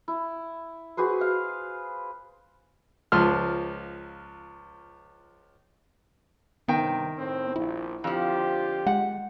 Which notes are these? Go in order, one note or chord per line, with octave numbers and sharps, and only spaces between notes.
E4
F#4 G#4 B4 C5
F5
C#2 F3 C6 F6
G2 C3 D#3 B3 G5
A2 C4
A#1 E4
F2 D3 F3 F4 G4
G#3 F#5